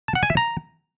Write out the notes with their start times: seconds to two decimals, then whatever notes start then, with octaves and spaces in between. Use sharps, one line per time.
0.08 A5
0.15 F#5
0.23 G#5
0.30 E5
0.37 A#5